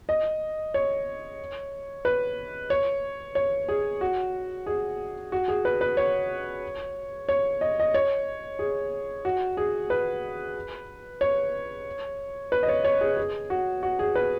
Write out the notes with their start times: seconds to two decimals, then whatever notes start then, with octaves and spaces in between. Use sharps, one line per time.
0.09 D#5
0.74 C#5
2.05 B4
2.70 C#5
3.35 C#5
3.69 G#4
4.01 F#4
4.66 G#4
5.32 F#4
5.48 G#4
5.65 B4
5.81 B4
5.97 C#5
7.29 C#5
7.61 D#5
7.80 D#5
7.94 C#5
8.59 G#4
9.25 F#4
9.57 G#4
9.90 B4
11.21 C#5
12.52 B4
12.63 D#5
12.69 C#5
12.84 C#5
13.01 G#4
13.17 G#4
13.50 F#4
13.83 F#4
13.99 G#4
14.15 B4